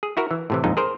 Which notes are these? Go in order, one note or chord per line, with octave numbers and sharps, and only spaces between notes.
G#4
E4 F#4 A#4
E3
A2 C3 E3
A#1 F2 G#2 D#4
G#4 A#4 C5